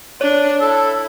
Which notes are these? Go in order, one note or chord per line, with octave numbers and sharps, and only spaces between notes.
D4 C#5
E4 A4